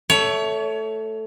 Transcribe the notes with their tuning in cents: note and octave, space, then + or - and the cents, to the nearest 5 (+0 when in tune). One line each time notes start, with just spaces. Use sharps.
A3 +0 C#5 +25